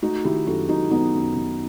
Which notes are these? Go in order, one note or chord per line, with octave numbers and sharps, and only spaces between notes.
A3 D#4 F#4
D#3 E4 G4
F#2 F#4 A4
F#2 D#4 F#4
D#3 B3 D#4
F#2
D#3